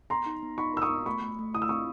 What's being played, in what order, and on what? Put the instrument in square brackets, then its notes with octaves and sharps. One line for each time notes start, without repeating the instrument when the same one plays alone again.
[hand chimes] B3 [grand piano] A#5 C6
[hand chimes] D#4
B3
[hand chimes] D#4 [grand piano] B5 C#6
[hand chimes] A#4 [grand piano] E6
[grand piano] C#6 D#6
[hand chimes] B3
[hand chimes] A3 [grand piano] B5 C#6
[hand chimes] A3
A3
[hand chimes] E4 [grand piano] D#6
[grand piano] E6
[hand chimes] C4 [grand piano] C#6 D#6